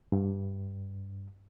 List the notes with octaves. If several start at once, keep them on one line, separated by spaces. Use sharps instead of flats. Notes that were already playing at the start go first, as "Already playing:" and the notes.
G2